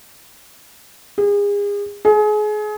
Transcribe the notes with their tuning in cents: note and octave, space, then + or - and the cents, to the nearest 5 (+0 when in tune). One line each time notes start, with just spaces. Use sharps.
G#4 -35
G#4 +30